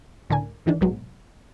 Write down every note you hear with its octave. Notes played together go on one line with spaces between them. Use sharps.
C#2 A2 D3 D4 A#4 G#5
G#2 D#3 E3 D4
A#1 G#2 B2 F#3 G#3